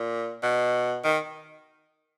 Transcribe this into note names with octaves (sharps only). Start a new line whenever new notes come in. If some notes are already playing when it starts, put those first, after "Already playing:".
Already playing: A#2
B2
D#3